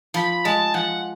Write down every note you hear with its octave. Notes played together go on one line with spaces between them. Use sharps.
F3 B5
G#3 A5
F3 F#5